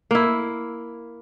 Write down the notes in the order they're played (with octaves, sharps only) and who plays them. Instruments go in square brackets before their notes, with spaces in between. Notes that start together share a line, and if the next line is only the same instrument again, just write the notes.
[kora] A#3 E4